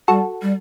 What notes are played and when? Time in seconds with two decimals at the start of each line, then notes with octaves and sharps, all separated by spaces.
0.08 G3 F#4 A4
0.42 G3